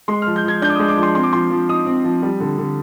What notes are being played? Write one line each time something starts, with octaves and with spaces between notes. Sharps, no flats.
G#3 C6
F3 F6
G6
F3 G#6
D4 G6
D6
G#3 D#6
D6
F3
C6
C4 C6
D6
F3 C6
F3
D#4 D#6
C4
F3
G3
D3
D3